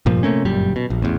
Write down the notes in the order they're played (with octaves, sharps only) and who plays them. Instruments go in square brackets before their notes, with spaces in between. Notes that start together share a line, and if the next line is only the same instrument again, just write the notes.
[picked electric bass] F1 G2 A#2 F3
C3 A3 A#3 C#4
G1 F#2 A#2 G3
B2
A#1
A1 E2